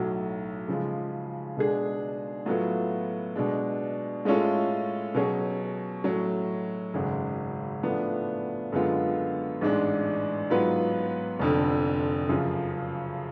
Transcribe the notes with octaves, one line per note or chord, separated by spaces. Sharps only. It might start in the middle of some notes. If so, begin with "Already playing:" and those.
Already playing: B1 A2 F#3
C#3 F3 G#3
B2 G#3 D4 G#4
A2 F#3 B3 F4
B2 G#3 D4
A2 G#3 C#4 F4 A4
B2 F#3 C#4 G#4
A2 F#3 C#4
G#1 F#2 C#3 G#3
A2 F3 B3 D4
F#2 D3 G#3 B3 F4
A1 G#2 G#3 D4
G#2 F#3 B3 F4 B4
F1 F2 D3
F#2 C#3 F3